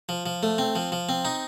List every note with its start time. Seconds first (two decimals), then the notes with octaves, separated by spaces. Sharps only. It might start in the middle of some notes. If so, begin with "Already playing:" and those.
0.09 F3
0.26 F3
0.43 A3
0.58 C4
0.75 F3
0.92 F3
1.09 C4
1.25 D#4